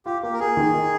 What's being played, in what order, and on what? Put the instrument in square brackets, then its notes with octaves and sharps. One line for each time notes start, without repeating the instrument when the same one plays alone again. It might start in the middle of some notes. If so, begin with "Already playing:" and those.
[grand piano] F4 [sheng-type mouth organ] G4
[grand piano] A#3 [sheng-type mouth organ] G4
[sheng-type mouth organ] A#4
[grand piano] A#3 [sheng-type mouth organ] G#4
[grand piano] D#3
D#4